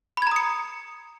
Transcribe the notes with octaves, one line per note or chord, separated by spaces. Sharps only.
A#5 B5 D#6 G#6 C#7